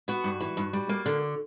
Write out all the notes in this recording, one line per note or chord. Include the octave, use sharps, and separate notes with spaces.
B3 F#4
G2
E3
G2
G3
A#3
D3